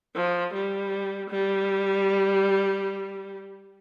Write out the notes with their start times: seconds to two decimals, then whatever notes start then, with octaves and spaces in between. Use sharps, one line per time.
0.15 F3
0.53 G3
1.30 G3